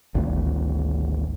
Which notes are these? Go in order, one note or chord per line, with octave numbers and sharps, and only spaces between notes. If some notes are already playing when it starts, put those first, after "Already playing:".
G#1 D2